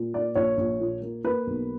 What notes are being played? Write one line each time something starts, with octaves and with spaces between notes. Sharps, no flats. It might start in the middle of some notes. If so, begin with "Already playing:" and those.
Already playing: A#2
A#3 D5
A#1 C#5
A#1
A#2
A#3
A#3 B4
B1